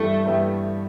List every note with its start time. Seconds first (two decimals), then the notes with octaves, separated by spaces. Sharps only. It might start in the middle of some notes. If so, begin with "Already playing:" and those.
Already playing: G2 E3 A3 B3 E4 G4
0.25 G2 E3 B3 E4 G4